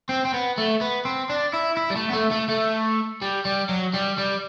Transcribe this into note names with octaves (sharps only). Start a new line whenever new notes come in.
C4
C4
B3
A3
B3
C4
D4
E4
E4
G3
A3
B3
A3
A3
A3
G3
G3
F#3
G3
G3